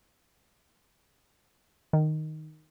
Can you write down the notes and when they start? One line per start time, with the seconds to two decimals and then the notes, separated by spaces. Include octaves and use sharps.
1.93 D#3